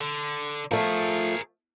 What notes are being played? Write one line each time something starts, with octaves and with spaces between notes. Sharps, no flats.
D3
F3 A3 G#4 A#4